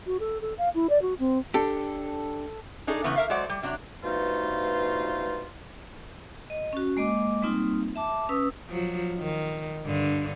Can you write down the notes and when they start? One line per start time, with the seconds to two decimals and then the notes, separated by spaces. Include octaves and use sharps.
0.06 F#4
0.20 A4
0.41 A4
0.58 F5
0.74 E4
0.89 D5
1.01 F#4
1.19 C4
1.54 D4 G4 A4
2.87 D4 D#4 G#4 A4
3.04 C#3 E3 A3 B3
3.16 A#4 E5 F5
3.29 F#3 G#3 C5 D5 F#5
3.49 G3
3.63 C3 F#3 D4
4.04 G2 B2 F3 A3 D#4 F4
6.50 D#5
6.73 C#4 F#4
6.97 G#3 A#3 D#5 D6
7.42 G3 A#3 C4 D#4 F4
7.96 E5 A5 D6
8.29 C#4 B4 D#6 E6
8.69 F3 F#3
9.18 D#3
9.86 G2 D3